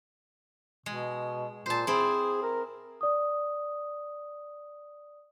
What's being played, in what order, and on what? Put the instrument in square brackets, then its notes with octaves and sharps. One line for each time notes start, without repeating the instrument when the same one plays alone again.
[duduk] B2 [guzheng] G#3
[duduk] A#2 [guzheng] C5 A5
[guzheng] C4 E4 [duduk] G#4
[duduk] A#4
[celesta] D5 D#6